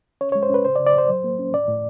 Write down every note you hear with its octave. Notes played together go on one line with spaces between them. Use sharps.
C#4 C#5
G#3 C#5
C5
C#4 B4
C#3 C5
D5
C#3
D5
C#3 C5
F#3
A#3
C#4
A2 D5
A2